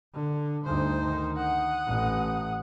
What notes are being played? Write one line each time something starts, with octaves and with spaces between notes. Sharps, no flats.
D3
D2 G2 D#4 C5
D#3
F#5 D#6
A1